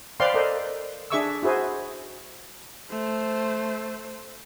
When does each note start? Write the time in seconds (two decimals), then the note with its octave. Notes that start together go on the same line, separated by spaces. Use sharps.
0.20 B4 C5 D5 F5 G5 C6
0.34 A4 A#4 C5 D5 D#5
1.10 D4 G#4 E5 C#6 D6 E6
1.43 E4 F#4 G#4 C5
2.90 A3 C5